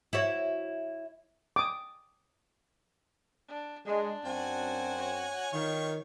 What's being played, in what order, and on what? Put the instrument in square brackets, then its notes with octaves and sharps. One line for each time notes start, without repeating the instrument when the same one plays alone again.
[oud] E4 F#4 C#5
[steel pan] D6 D#6
[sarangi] D4
[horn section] G#3 [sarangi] D4
[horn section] F#2 C4 [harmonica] F#4 G#5
[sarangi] C#5
[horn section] D#3 [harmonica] F4 C#6